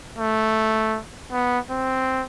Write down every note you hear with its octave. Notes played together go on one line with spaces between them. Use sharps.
A3
B3
C4